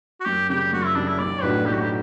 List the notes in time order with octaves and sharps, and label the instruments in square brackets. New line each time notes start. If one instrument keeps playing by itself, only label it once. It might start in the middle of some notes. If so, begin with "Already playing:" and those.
[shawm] F#4
[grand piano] F#2 [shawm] G4
[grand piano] C#3 G3 [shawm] G4
[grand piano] F#2 [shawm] F#4
[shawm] E4
[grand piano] C#3 G3 [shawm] D4
[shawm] E4
[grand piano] B1 [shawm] D5
[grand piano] A2 G3 D4 F#4 [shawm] B4
[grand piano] B1 [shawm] G4
[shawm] F#4
G4